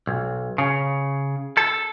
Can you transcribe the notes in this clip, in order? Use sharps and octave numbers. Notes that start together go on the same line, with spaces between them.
B1
C#3
A4